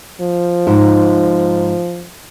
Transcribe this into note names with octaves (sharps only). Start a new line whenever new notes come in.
F3
G#2